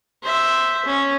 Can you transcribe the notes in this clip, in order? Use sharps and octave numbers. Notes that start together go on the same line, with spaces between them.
C5 E5
C#4